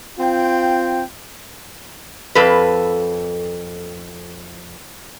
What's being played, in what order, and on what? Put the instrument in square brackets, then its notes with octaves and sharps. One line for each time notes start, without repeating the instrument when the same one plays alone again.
[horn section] C4 F4 G5
[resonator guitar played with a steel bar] F2 A4 B4